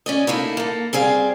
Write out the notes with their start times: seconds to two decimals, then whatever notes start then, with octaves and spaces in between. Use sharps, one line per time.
0.06 C#4 D5 D#5
0.27 A3 A#3 D#4 E4
0.57 A#3 A4
0.93 G3 C4 G#4 F5